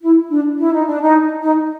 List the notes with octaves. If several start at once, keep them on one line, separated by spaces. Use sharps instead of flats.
E4
D4
E4
D#4
D4
D#4
D#4